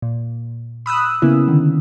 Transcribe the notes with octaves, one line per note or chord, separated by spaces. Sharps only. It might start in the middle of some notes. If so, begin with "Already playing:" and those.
A#2
B5 D#6 E6 F#6
C#3 A#3 B3 C#4 E4
D3 D#3